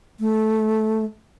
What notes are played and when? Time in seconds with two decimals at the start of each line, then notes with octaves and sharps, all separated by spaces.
0.20 A3